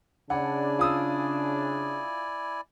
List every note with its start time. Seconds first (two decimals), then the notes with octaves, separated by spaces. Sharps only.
0.30 C#3 D4 E4 D5 F#5 G#5
0.79 F4 D#6 E6